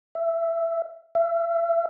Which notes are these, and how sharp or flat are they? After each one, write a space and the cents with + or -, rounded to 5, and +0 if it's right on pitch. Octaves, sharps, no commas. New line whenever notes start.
E5 +15
E5 +35